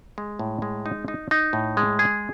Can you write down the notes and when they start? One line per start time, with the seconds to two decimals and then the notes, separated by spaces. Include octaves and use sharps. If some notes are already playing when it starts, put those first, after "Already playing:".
0.18 G#3
0.39 A2
0.62 G#3
0.86 D#4
1.08 D#4
1.31 D#4
1.53 A2
1.77 G#3
1.99 G#4